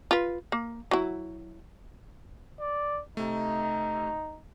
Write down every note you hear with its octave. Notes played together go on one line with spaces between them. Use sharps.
F4 B4
A#3
F#3 E4
D5
C3 A3 D#4